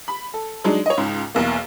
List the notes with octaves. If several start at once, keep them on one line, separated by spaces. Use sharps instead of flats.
B5
A4
F#3 G#3 D4 D#4
C#5 D#5
C#2 G#2
B1 E2 A#3